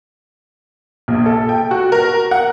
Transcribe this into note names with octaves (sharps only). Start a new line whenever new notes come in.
A#1
A4
G5
F#4
A#4
F#5